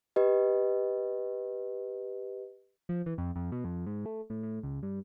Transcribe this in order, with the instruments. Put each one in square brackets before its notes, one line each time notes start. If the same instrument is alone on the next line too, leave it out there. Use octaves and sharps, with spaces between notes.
[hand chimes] G4 B4 D#5
[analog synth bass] F3
E3
F2
F2
B2
F2
G#2
A3
A2
A2
C#2
G2